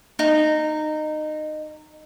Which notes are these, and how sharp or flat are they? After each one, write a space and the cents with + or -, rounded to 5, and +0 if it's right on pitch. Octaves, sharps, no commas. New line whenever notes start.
D#4 -20